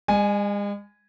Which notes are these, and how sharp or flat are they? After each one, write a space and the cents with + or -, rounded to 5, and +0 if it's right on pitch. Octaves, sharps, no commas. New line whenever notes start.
G#3 -40 G#5 +0